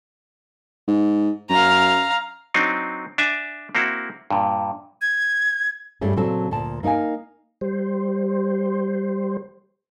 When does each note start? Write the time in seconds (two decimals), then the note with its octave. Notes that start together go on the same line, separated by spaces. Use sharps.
0.88 G#2
1.50 F#2 F5 A#5
2.54 F#3 C4 D4 D#4
3.18 D4 E5 G#5
3.75 A#3 C4 E4 F#4
4.31 G2 A#2
5.02 G#6
6.01 G2 G3 A3 C#4 G#4
6.16 A#2 C#3 F#3 C4 A4 A5
6.51 D2 A#2 A5
6.83 A#3 D#4 A#4 F5 G#5
7.61 G3 C5